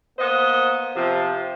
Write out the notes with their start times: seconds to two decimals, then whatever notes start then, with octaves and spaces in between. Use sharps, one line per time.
0.19 A#3 B3 C5 D#5
0.96 C3 F3